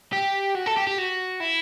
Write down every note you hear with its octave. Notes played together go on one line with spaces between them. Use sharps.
G4
F#4
A4
G4
G4
F#4
E4